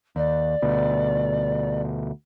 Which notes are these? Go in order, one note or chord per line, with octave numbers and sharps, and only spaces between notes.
D#2 D5
D2 B2